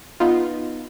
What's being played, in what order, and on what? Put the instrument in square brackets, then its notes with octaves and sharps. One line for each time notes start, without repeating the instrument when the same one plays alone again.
[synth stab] B3 D#4 F4